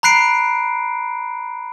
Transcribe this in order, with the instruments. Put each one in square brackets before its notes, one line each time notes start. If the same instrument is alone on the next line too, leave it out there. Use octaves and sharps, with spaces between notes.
[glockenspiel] A#5 B5 F#6 C7 D7